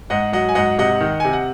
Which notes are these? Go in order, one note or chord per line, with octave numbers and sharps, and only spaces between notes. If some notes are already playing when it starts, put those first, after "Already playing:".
G#2 D#5 F#5
F#3 D#5 F#5
G#5
G#2 D#5 F#5
C3 D#5 F#5
D#3
C3 G#5
F#5